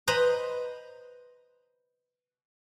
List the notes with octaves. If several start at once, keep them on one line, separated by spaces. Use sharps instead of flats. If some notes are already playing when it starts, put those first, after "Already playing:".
B4 C5 D#5 A#5 B5